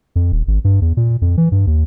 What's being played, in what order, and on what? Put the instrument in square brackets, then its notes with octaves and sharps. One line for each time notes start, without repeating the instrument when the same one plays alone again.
[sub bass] F2
D#1
G#1
G2
E2
A#2
F2
E3
G2
D#2